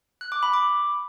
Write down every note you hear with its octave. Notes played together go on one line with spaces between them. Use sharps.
F#6
D6
B5
D6